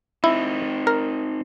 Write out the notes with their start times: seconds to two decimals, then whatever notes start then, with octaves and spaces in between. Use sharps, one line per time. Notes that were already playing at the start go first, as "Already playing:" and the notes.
0.24 C4 D#4 E4
0.87 A#4